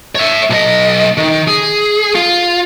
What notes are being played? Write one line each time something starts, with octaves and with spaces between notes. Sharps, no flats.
C#5 E5
B1 D#5
D#3
G#4
F4